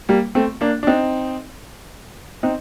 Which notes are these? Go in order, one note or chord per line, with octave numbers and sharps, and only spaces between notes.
G3 A#3
A3 C4
A#3 D4
D4
C4 D#4
C4 D#4